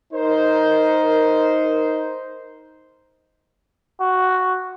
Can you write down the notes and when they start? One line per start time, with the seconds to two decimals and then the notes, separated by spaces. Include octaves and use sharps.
0.13 D#4 A#4 C5
4.00 F#4